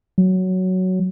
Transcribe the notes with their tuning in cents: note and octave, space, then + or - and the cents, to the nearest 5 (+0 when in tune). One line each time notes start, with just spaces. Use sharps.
F#3 +5